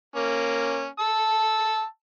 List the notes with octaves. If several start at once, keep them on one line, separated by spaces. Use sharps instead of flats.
A#3 C#4
A5 E6